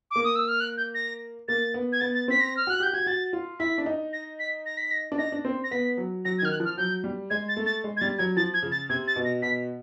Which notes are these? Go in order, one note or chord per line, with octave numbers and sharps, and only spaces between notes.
A#3 D6
D#6
E6
F6
F#6
G6
A#6
A#3 A6
B3
G#6
B3 A6
A6
C4 B6
A#6
F6
F#4 F#6
G4 G6
F#4 G#6
F#4 A6
F4
E4 B6
D4
D#4
A#6
B6
A#6
B6
A#6
D4
D#4 A#6
D4
C4
A#6
B3 B6
F#3
F#3 A#6
G#6
D#3 F6
F#6
F3
F6
F#3 G6
G3
G#3 G#6
A6
A3
A6
G#3
G#6
G3 A6
F#3 G#6
F3 A6
G#6
C#3
A6
C3 G#6
A6
B2
A#6
B2 B6